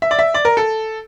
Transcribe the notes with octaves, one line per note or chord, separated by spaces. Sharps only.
E5
D5
E5
D5
A#4
A4